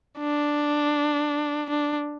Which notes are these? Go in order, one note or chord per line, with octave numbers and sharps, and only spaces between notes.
D4
D4